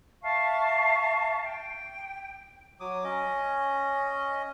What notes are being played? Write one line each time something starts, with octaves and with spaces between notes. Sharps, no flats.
E5 F5 A5 C#6
G5
F#3 D6 D#6
C#4 D#5